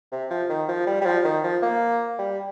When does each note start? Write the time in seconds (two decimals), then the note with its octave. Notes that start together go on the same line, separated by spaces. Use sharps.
0.12 C3
0.30 F3
0.49 D#3
0.68 F3
0.87 G3
1.02 G3
1.06 F3
1.25 D#3
1.44 F3
1.62 A#3
2.19 G3